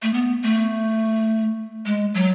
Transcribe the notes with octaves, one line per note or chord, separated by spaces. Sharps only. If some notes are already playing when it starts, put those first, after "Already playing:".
A3
B3
A3
G#3
F#3